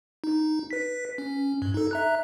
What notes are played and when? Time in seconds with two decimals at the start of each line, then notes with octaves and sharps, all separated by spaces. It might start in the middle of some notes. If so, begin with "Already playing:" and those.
0.24 D#4
0.71 B4 B6
1.18 C#4
1.62 G2
1.74 D#4 A4
1.91 E5 A#5 F#6